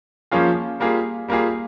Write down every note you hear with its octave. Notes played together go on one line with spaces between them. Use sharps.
F3 A#3 C#4 F4 G#4
G3 A#3 F4 G#4
G3 A#3 F4 G#4